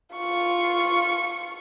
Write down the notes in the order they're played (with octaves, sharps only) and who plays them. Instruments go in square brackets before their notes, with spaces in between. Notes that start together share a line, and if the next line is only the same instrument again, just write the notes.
[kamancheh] F4 C#6